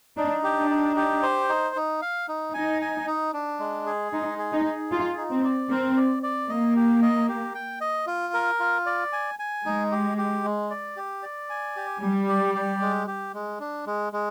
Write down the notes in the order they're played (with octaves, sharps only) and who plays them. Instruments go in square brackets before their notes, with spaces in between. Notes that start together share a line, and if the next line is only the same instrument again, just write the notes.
[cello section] D4 [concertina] D#4
[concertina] G4
[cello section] D4
[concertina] D#4
G4
C5
D#4
D#4
F5
D#4
[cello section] D#4 [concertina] G#5
[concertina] G#5
D#4
D4
G#3
G#4
[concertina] G#3 [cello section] D#4
[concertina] G#4
[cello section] D#4
[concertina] G#4
[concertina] D#4 [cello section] F4
[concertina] D#4
[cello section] C4
[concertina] D5
[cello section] C4 [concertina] A#4
[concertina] D5
D5
[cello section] A#3 [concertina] D#5
[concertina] G4
D#5
G4
G5
D#5
F4
A#4
F4
D5
G#5
G#5
[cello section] G#3 [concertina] D#4
[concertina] G4
G4
G#3
D5
G4
D5
G#5
G4
[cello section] G3 [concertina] G4
[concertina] D5
G4
G#3
G4
G#3
D4
G#3
G#3